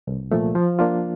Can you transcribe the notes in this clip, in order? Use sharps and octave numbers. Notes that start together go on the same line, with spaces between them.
C2
A#2 F3 A3
F3
A#3 D4 F4